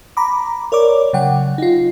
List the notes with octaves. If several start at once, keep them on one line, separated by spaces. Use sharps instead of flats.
A#5 B5 D6
A#4 C#5 D5 D6
C#3 F#3 F#5 G5
D#4 F4